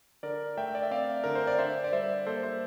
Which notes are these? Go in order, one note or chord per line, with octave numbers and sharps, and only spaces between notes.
D3 A#4 D5
A3 E5 G5
D5
E5
C4 D5 F5
D3 A#4
C5
D5
D3 C5 E5
D5
G3 C5 E5
A#3 A4 C5
C5 E5